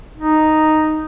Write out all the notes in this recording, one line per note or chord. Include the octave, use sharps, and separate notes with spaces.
D#4